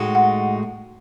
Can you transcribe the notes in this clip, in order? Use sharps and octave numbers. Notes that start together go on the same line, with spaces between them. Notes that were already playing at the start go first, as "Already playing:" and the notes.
Already playing: A2 G#3 D#4 F#4
F#5